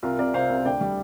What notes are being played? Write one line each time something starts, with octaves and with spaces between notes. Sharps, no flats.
C2 F4 A#4
C3 A#4 D5
C3 C5 F5
C2
D2 D5 G5
G3